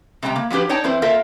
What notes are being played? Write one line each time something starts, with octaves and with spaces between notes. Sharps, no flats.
C3 G3 G#3 G5 A5 A#5
A#3
F3 F#3 D4 G4 B4
D#4 C#5 D5 G5 A5
E3 C4 E4 B4 C5
A#3 F4 A4 A#4 E5